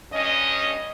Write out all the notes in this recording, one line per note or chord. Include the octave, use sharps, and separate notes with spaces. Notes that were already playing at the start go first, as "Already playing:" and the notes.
G2 C#4 D#5